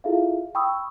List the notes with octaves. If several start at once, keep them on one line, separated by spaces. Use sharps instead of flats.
E4 F4 G#4 A4 E5 F5
G5 B5 C#6 D#6 E6